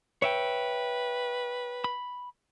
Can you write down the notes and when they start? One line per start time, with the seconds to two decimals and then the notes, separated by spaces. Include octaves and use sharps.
0.22 B4 C#5 E5 G5
1.84 B5